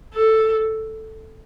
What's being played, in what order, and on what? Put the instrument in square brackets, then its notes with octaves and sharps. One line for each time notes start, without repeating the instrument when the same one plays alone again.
[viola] A4